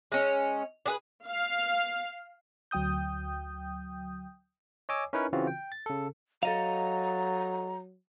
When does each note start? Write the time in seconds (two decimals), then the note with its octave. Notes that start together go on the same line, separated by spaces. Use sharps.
0.12 G#3 C#4
0.86 D4 G#4 B4
1.27 F5
2.71 D2 F#3 G5 D#6 G6
4.89 C#5 D#5 G#5 D6 E6
5.13 C#4 D#4 E4 A#4 B4 C#5
5.33 C#3 E3 C4 F4 F#4
5.47 G5
5.72 A6
5.86 C#3 A4
6.43 F#3 A4 D#5 F5 A#5